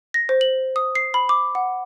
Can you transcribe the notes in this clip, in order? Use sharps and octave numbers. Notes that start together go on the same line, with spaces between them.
A#6
C5
F#7
D#6
C7
B5
D6
F#5